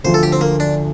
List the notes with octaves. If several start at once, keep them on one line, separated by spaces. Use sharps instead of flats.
D2 D3 F3 C5
A4
G4
C4
A#3
D4